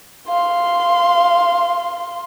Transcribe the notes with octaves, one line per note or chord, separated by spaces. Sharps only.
F5 C6